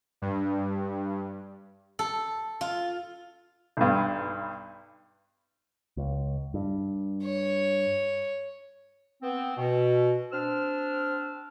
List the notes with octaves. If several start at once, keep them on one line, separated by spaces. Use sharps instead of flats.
G2
A4
F4
B1 G2
C#2
G2
C#5
B3 C4
B2
C4 D4 E6 F6